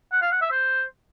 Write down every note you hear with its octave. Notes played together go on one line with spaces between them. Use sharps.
F#5
F5
F#5
E5
C5